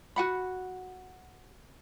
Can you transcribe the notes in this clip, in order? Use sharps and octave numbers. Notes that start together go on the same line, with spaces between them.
F#4 F#5 B5